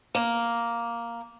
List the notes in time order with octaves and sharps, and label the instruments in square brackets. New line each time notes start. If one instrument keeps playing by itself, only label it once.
[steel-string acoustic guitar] A#3